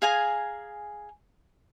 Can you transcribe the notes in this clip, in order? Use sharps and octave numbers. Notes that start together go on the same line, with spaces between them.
G#4 F5 G#5 A#5